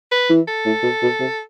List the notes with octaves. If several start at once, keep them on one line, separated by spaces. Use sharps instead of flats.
B4
E3
A4
A2
B2
B2
C3